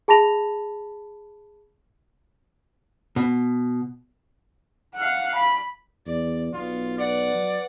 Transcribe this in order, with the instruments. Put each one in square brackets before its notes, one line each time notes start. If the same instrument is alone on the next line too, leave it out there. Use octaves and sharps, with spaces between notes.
[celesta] G#4 A5 B5 A#6 F7
[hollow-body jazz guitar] B2
[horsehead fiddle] F5 F#5
B5
[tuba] E2 [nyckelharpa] D5
[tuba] B1 [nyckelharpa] B3 [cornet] F4
[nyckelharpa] B4 F#5 [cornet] D5
[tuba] F#3